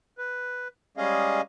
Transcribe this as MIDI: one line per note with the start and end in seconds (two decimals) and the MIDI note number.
0.18 0.68 71
0.97 1.41 55
0.97 1.41 56
0.97 1.41 61
0.97 1.41 68
0.97 1.41 75
0.97 1.41 77